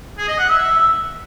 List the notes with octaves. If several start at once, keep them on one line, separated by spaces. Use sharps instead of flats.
G#4
D#5
F#5
E5